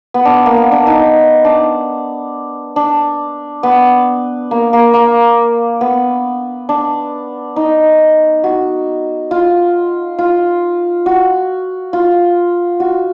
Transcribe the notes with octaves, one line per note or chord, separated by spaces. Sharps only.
B3
D4
A#3
B3
D4
D#4
D4
D4
B3
A#3
A#3
A#3
B3
D4
D#4
F#4
F4
F4
F#4
F4
F#4